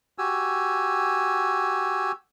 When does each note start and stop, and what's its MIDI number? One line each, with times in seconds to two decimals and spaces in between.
0.18 2.12 66
0.18 2.12 67
0.18 2.12 80
0.18 2.12 88